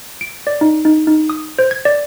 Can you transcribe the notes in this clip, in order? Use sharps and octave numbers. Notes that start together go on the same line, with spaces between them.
D7
D5
D#4
D#4
D#4
D#6
C5
G#6
D5